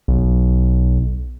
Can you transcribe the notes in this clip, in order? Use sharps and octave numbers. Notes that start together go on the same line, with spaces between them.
B1